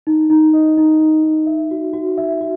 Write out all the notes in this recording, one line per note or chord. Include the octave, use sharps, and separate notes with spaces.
D#4
D#4
D#5
D#4
D#4
D#4
E5
F#4
F#4
E5
F#4